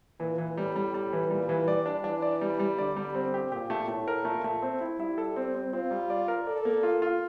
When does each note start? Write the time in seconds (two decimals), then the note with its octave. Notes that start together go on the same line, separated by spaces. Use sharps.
0.20 A#2 E3
0.38 E3
0.57 A2 G3
0.76 G3
0.94 G3
1.13 E3
1.31 A#2 G3
1.49 E3
1.68 G3 D5
1.86 D4
2.04 E3 D4
2.22 D5
2.41 G3
2.59 G3
2.78 D3 D5
2.96 G3
3.15 C4
3.34 G4
3.52 A#2 G4
3.70 A3
3.88 A2 A3
4.08 A#4
4.25 A#2 A3
4.44 A3
4.62 C4
4.81 E4
4.99 G3 E4
5.18 A4
5.36 C4
5.55 C4
5.73 C4 F4
5.91 G3
6.10 D5
6.28 A#4
6.46 A4 D5
6.65 A#3
6.83 F4
7.02 F4